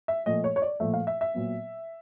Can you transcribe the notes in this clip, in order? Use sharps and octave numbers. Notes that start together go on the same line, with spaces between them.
E5
A#2 F3 A3 D#5
C#5
C#5
D5
A#2 F3 A3 E5
F5
E5
E5
A#2 F#3 B3